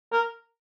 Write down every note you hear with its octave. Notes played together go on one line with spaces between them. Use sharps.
A#4